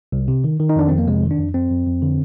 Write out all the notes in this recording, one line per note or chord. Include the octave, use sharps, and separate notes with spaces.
C2
C3
D#3
D#3
D#4
F2 D4
F2 C4
A#3
C3 G#3
D#3
D4
F2
F2 C4
F2
F2
D3